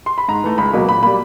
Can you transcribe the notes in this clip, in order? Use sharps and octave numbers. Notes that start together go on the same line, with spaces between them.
C6
B5
G#2 A#5
E3 A3
C#2 B5
B2 F#3 A#3
A#2 B5
G3 A#3 B5